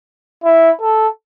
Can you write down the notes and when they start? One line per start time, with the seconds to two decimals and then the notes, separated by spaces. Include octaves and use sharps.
0.44 E4
0.81 A4